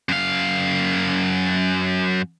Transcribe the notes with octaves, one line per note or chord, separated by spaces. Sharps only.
F#2 F5